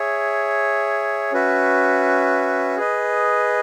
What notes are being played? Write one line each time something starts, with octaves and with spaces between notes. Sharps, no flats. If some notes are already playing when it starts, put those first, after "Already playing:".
Already playing: G#4 C#5 E5
C#4 F#4 B4 E5
G#4 B4 D#5